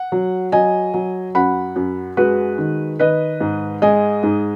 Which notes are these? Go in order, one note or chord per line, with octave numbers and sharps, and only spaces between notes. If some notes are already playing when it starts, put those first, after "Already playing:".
Already playing: F#5
F#3
F#3 D#5 G#5
F#3
F#2 F#5 B5
F#2
G#3 F#4 B4
D#3
D#3 B4 D#5
G#2
G#3 D#5 G#5
G#2